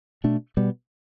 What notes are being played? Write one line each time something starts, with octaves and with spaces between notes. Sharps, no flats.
B2 A3 D4
B2 G3 B3